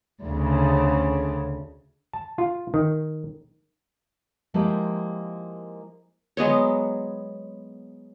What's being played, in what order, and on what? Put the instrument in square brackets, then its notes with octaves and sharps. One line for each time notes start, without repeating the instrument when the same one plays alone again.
[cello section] D2 C#3
[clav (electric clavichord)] A5
F4
D#3
[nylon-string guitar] F3 G#3 A#3 E4 G4
[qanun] F#3 G#3 B3 C#5